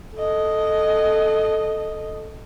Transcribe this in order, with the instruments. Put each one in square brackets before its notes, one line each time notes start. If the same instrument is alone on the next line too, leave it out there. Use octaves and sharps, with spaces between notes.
[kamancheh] A4 D#5